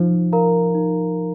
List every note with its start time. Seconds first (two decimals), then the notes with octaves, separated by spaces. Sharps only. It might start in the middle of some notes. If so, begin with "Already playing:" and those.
Already playing: F3 D#4
0.32 A#4 F5 A#5
0.75 D#4